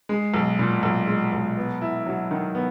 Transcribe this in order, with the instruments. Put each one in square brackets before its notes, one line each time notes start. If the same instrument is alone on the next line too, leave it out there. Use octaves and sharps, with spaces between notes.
[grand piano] G#3
B1
A#2
B1
G#3
B1
B3
E4
F#3
D#3
B3